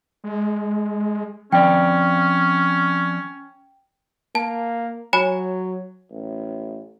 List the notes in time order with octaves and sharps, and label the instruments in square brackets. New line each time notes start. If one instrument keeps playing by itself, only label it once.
[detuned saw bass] G#3
[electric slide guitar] F3 C4 D5 [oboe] C#4 [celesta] G5
[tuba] A#3 [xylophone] A5
[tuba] F#3 [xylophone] C#5 G#5 B5
[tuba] A1